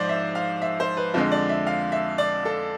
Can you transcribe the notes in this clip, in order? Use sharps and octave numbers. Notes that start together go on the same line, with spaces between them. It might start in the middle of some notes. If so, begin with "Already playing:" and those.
Already playing: G#2 F3 G#3 C5 D5
E5
F5
E5
C5
B4
F2 D3 G#3 F4
D5
E5
F5
E5
D5
A4